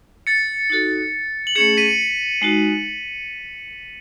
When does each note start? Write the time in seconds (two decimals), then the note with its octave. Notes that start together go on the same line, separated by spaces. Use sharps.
0.27 A6 C#7
0.70 D#4 F#4 A4
1.47 F#7
1.55 A3 C#4 G#4 C#7 E7
1.77 B6 D#7
2.42 G#3 D#4 F#4